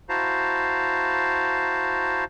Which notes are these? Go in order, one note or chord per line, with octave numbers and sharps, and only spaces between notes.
E4 F#4 C5 F5 A5 A#5